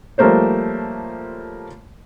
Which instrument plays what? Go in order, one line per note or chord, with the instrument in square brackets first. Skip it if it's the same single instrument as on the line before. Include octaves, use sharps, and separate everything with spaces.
[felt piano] F3 G3 A3 A#3 C5 C#5